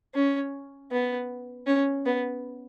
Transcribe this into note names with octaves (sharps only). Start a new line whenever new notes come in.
C#4
B3
C#4
B3